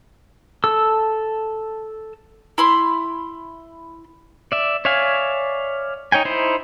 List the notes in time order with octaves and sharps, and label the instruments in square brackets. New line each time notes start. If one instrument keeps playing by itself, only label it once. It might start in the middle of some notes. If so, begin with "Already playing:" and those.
[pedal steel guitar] A4 E6
[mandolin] E4 B5 C6
[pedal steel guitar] D5 E5
C#5 D5 E5 F5 G#5
D#4 C#5 G5 G#5
D#4 E4 C5